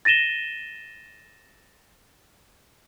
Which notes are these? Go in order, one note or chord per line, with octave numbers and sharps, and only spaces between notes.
A6 A#6 D#7 E7 G7